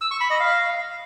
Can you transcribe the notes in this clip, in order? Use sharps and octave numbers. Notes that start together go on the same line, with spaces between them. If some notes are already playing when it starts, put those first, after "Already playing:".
E6
C#6
B5
D#5
F5